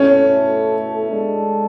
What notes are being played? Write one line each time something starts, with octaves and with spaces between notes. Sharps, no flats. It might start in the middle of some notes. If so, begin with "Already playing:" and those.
Already playing: B2 A3 C#4 E4 A4
G#3 D4 A4